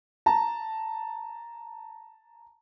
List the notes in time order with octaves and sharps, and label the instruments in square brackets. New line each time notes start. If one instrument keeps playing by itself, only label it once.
[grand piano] A5 A#5